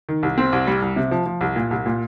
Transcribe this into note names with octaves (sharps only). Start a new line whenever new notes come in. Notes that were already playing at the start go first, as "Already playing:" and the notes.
D#3
C2
C4
C2
G3
C2
C3
F3
F3
C2
A#2
C2
A#2